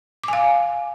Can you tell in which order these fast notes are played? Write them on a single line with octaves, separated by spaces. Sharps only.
D6 G#5 F5